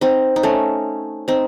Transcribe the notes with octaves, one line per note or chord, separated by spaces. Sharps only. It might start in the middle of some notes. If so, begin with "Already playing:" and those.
C4 D#4
D#4
A3 C#4
C4 D#4